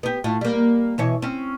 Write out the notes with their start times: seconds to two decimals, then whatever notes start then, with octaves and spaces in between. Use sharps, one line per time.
0.03 B3 G4
0.24 A2 F4
0.41 G3 A#3
0.98 B2 E3 C#5
1.22 C4 C#4